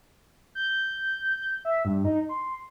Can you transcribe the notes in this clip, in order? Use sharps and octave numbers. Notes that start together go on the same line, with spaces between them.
G6
E5
G2
D#4
C6